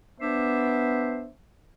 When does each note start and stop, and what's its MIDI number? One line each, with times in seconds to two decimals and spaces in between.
0.20 1.28 59
0.20 1.29 62
0.20 1.29 72
0.20 1.29 76